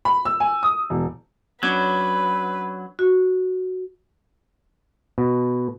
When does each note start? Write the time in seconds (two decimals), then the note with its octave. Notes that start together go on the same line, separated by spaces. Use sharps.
0.05 B5
0.25 E6
0.40 G#5
0.63 D#6
0.90 E1
1.63 F#3 C#4 D4 B4 G#6
2.99 F#4
5.18 B2